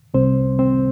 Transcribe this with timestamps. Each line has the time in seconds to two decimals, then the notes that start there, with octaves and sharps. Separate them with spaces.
0.14 C2 C3 G3 C4 C5
0.59 C4 C5